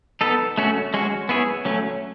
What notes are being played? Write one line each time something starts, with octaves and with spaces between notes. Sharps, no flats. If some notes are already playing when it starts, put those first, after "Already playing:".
B3 D#4 A4
A3 C#4 F#4
G#3 C#4 F#4
B3 E4 G#4 C#5
F#3 A3 C#4